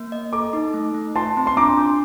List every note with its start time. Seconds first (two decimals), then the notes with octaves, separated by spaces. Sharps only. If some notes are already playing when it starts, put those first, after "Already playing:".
Already playing: A#3
0.12 D#5
0.33 A4 A#5 D6
0.53 D#4
0.74 A3
0.94 A3
1.15 F4 A5 C6
1.37 C4
1.47 C6
1.57 D4 A#5 D6
1.78 D4